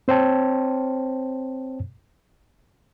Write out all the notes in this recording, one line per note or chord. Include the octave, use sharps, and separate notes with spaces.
C4 C5 C#5 G5 A5